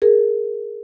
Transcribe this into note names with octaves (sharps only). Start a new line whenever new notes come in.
G#4 A#4